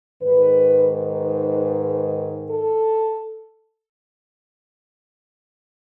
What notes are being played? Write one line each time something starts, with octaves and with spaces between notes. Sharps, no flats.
G#2 D#3 B4
B4
A4